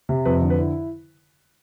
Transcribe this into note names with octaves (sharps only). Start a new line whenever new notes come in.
C3
F2 B4
D3
B4
E4